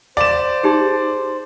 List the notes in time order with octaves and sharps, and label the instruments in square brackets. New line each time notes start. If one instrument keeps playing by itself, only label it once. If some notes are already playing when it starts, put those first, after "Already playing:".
[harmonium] C5 [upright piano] D5 E7 [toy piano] F5
[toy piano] D#4 G4 G#4